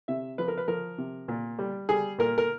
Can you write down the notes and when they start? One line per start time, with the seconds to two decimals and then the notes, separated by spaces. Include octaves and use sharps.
0.08 C3 E5
0.38 F3 B4
0.48 A#4
0.58 B4
0.68 F3 A#4
0.98 C3
1.28 A#2
1.59 G3
1.89 G3 G#4
2.19 A#2 A#4
2.38 A#4